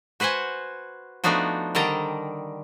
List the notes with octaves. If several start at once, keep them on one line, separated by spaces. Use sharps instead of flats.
F#4 B4 C5 F#5 G#5
F3 A3 B3 D4 D#4 F#4
D3 D#3 G3 D#5 A5 A#5